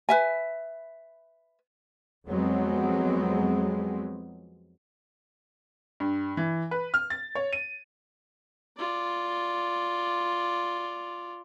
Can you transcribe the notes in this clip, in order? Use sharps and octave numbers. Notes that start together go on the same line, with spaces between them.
B4 E5 G#5
F2 F#3 G#3 B3 C4
G2
E3
B4
F6
A6
C#5
D#7
F4 D5